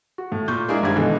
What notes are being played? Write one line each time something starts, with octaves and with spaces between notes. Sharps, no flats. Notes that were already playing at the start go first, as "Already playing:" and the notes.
F#4
A2
A#2 C#6 G6
G#3 A#3 D4 E4 G#4
G#1 G2 D#3 G3 G#6
B2 D3 E3 G#3 A3